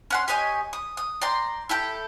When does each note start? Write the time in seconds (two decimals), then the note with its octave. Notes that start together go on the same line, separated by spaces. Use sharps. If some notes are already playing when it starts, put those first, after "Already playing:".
0.10 C#4 F#5 C6
0.28 G4 C#5 D#5 G#5
0.73 D#6
0.97 D#6
1.22 D5 G5 A#5 C6
1.69 E4 G4 A4 G5